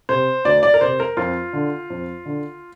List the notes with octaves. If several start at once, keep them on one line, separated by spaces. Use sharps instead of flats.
C3 C5
D2 D5
D5
A#4
C3 C5
A#4
F2 F4
D3
F2
D3